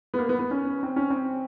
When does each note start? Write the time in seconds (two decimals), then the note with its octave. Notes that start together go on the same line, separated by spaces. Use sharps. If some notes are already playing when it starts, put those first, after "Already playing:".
0.14 B3
0.18 A#3
0.29 B3
0.39 B3
0.51 C#4
0.83 C4
0.96 C#4
1.10 C4